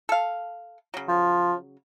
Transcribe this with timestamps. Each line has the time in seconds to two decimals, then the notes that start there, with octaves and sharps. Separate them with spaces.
0.09 A4 F5
0.94 C#3 F#3
1.08 F3